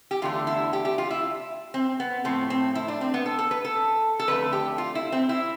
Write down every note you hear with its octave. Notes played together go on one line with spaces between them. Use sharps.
G4
E2 D3 A3 F4
E4
G4
G4
F4
E4
C4
B3
A2 F3 A3 C4
C4
E4
D4
C4
B3
A4
A4
B4
A4
A4
F2 D3 A3 B4
G4
F4
E4
C4
E4